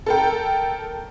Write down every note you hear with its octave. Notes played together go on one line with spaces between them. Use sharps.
A4 A#4 G5